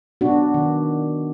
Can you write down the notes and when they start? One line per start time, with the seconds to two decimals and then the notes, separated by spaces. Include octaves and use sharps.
0.21 B3 D4 F#4
0.54 D#3